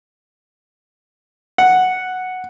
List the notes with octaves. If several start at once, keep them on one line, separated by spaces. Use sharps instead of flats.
F#5